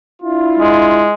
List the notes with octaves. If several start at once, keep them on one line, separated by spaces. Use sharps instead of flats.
D4 E4 F4
G#3